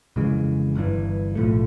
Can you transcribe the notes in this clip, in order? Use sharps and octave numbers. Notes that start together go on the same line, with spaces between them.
F2 C#3 E3 G#3
G1 G2 E3
B1 A2 F3 A3